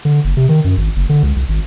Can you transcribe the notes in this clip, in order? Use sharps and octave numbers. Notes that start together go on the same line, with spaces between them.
D3
F#1
C3
D#3
F#2
G#1
F#1
D3
C#2
C2
G#1